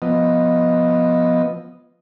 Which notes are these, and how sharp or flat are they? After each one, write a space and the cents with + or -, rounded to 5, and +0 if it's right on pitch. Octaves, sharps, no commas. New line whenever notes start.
F3 +0 B3 +0 D#5 +0